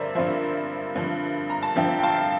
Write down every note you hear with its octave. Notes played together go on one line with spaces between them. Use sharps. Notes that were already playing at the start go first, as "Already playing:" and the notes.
Already playing: G2 D3 F3 A#4 C5 D5 E5
G2 D3 F3 C5 E5
G2 D3 F3
A#5
A5
G2 D3 F3 E5 G5
G5
F5 A5